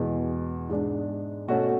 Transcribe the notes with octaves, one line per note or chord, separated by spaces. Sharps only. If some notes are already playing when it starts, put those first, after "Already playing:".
Already playing: E2 B2 G#3
G#2 G#3 D4
B2 A3 C#4 F#4